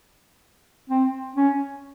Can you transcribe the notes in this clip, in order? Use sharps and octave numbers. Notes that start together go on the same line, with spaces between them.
C4
C#4